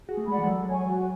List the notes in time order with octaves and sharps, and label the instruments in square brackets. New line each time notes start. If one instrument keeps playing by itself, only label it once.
[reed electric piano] F#4 [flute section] G#4
[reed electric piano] A3
[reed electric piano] G#3 [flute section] D5 F#5 B5
[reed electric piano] E3
G#3
[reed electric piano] F#3 [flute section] A4
[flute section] C#5 G#5 C#6
F#4